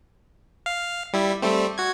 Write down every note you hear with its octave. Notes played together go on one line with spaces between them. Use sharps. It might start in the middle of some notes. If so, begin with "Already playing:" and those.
F5
G3 E4
G3 A3 C4
F#4 G#6